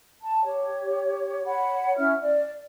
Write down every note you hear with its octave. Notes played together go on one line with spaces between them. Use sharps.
A5
G4 C#5
C#5 F#5 B5
C#4 E4 E5 F6
D5